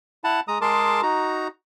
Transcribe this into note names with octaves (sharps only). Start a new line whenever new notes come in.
E4 F#5 A5
G#3 A#5 D#6
G#3 G#4 A#4 A5 C6 D6
D#4 F#4 A#5